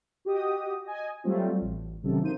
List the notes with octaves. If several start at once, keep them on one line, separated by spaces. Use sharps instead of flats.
F#4 G4 D#5 D#6
D#5 G#5
F#3 G3 A3 C4 F4
A1
C3 D#3 F#3 C#4 A4
A#3 D#4 C5 D#7